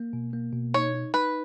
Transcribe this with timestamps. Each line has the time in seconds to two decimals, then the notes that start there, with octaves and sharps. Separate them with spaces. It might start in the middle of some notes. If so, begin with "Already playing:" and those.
Already playing: A#3
0.13 B2
0.33 A#3
0.53 B2
0.74 D#4 C#5
0.95 D#4
1.14 D#4 B4